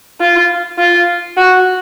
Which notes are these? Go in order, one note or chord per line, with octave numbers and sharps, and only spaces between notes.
F4
F4
F#4